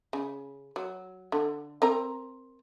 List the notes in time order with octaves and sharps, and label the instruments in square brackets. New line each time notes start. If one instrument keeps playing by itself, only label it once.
[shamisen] C#3
F#3
D3
C4 A#4 A#5